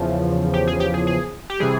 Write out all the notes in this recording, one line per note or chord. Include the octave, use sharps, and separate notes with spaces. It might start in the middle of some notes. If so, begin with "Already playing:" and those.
Already playing: E2 C#3 F3
G4
G#4
G4
G#4
G#4
G4
C3 E3 G3 G#4